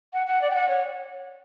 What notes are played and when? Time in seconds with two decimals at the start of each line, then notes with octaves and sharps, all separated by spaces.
0.13 F#5
0.27 F#5
0.42 D5
0.51 G5
0.55 F#5
0.69 C#5